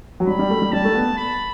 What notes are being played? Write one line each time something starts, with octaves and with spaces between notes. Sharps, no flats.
F#3
G3 B5
G3
A3
G3
G3 A5
A3
B3
B5